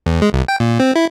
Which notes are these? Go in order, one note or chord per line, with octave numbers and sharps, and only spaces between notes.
E2
G#3
C2
G5
A#2
C4
E4